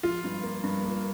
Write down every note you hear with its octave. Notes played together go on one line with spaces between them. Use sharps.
F3 F4
G2
A#3
G2
A#3